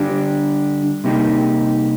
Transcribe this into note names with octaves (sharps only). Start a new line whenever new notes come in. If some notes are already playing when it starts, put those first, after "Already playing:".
Already playing: D3 G3 D4 G4
C3 G3 A#3 D#4 G4